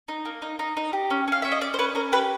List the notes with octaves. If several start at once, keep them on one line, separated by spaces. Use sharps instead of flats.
D#4
A#3
D#4
D#4
D#4
G4
C#4
C#4 F5
C#4 E5
D#5
C#4 D5
C5
C#4 B4
C#4 A#4
G4 B4